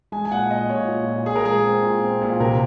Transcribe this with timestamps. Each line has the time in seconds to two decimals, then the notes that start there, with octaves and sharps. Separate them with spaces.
0.12 G#3 G#5
0.25 G#5
0.31 A#2 F#5
0.50 A#2 D#5
0.69 A#2 C#5
0.88 A#2
1.07 A#2
1.26 A#2 G#4
1.36 A#4
1.45 G#3 G#4
1.64 C4
1.83 A#2
2.03 C4
2.21 A#2
2.40 C3 A#4